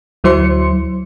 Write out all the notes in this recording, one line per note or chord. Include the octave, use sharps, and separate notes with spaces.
D2 F#3 E4 C5 C6 C#7